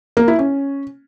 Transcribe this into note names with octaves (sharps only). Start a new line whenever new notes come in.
A#3
E4
C#4